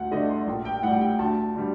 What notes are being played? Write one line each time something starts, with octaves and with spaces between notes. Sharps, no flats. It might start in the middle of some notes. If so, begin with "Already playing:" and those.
Already playing: D2 F#5
D3 A3 D4 D#5
C6
A#1
G5
A2 G3 F#5
G5
D2 A5
D3 G3